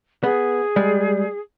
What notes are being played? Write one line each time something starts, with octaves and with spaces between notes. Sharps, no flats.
B3 G#4
G3 G#3